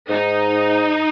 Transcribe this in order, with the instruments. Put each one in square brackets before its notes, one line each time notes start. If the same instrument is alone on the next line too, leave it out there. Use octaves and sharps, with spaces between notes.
[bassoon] G#2 [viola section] D#4